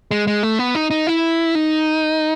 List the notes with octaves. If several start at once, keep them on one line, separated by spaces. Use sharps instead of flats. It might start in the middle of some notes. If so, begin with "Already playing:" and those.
G#3
G#3
A3
B3
D#4
D#4
E4
D#4